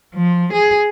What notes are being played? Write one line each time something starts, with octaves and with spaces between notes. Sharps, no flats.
F3
G#4